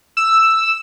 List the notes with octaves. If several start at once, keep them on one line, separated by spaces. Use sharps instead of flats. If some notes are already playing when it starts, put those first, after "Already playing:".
E6